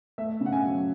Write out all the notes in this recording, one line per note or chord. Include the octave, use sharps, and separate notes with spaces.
A3 E5
C#3
F#5
G#5
F#3